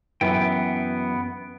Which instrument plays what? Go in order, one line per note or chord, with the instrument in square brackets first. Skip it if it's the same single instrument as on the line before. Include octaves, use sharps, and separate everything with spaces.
[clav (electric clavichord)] F#2 E3 [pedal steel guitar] B3 G5